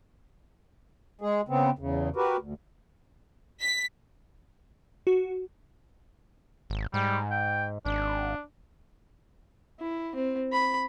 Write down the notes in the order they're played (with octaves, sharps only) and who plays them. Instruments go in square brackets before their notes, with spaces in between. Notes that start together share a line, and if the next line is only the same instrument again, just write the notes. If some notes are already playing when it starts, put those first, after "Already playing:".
[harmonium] G#3 G#4
C#3 B3 C4
E2 C#3
F#4 G4 A#4 B4
D2
[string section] B6
[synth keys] F#4
[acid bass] G#1
[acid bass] G#2 [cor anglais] G3
[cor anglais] G5
[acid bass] G#1 [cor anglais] D4
[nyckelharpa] E4
C4
B5